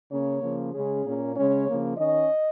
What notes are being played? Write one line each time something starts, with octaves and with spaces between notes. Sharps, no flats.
C#3 A#3 C#4 C#5
C#3 F3 A#3
C#3 G#3 C#4 G#4
A#2 A#3 C#4
C#3 G#3 C#4 C#5
C#3 F3 A#3
D#3 C#4 D#5